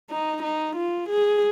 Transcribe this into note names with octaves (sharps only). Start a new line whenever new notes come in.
D#4
D#4
F4
G#4